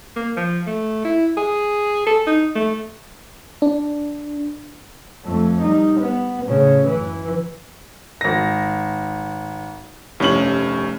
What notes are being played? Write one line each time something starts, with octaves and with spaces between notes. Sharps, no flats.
A#3
F3
A3
E4
G#4
A4
D#4
A3
D4
F2 A3
G3 D#4
B3
A2 C#3
F#2 E3
G#1 A#6
F1 G2 C#4 F#7